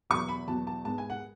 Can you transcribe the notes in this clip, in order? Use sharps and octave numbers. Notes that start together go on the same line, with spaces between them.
E2 B2 F#3 B3 C#6
B5
E2 B2 F#3 B3 A5
A5
G#2 G#3 B3 A5
G#5
F#5